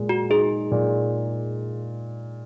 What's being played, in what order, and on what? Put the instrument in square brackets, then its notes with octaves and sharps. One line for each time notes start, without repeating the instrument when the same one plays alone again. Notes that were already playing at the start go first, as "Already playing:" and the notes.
Already playing: [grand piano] A#2 G#3
[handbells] F#4
[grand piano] D#4 [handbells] G#4
[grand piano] A#2